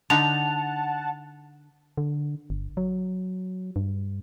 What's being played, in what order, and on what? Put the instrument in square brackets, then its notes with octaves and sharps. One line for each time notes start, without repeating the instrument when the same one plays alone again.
[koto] D3 D#4 [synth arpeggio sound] F#5 A5 [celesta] F7
[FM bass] D3
G1
F#3
G2